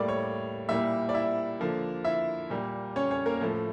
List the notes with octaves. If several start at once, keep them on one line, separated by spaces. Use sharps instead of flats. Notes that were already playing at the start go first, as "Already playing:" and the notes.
Already playing: A2 G3 A#3 D5 D6
C#5 C#6
A#2 G3 A#3 E4 E5
D5
E4 E5
D3 F3 A#3
E4 E5
A#2 G3 A#3
C#4 C#5
C#4 C#5
A#3 A#4
A2 F3 A3